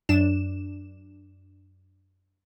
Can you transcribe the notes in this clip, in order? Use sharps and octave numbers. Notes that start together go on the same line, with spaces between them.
F#2 D4 E7